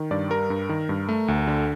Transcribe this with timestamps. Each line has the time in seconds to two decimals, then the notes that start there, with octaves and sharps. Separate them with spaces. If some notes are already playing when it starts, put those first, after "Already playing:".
Already playing: D#3
0.11 G2 D5
0.30 G3 A#4
0.50 G2
0.69 D#3
0.89 G2
1.09 A3
1.28 D2
1.48 D3